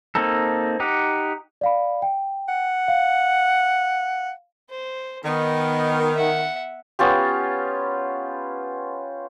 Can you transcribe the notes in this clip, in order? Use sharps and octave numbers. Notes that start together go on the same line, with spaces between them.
A#3 C4 D#4 A4
D#4 G4 F#5
D5 F5 B5
G5
F#5
F5
C5
D#3 B3
E5 F#5
B3 C#4 F4 G4